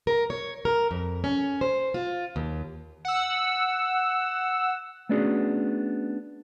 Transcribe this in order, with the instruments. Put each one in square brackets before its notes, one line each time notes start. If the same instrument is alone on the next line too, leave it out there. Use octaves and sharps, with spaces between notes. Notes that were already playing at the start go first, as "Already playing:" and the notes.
[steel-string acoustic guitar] A#4
C#5
A#4
F2
C#4
C5
F4
D#2
[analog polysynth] F#5 E6
[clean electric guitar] A3 B3 C#4 D4 F#4 G#4